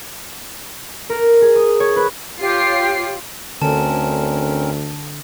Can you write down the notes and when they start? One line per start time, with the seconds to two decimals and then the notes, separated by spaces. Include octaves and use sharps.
1.10 A#4
1.42 G#4
1.56 D#6
1.80 C#5
1.96 B4
2.40 F4 G4 C#5 C7
3.62 D2 D3 C4 C#4 A#4 A5